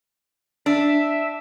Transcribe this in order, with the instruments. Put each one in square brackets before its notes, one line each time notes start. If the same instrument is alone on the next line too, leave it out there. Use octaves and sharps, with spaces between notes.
[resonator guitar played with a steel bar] D4 [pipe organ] E5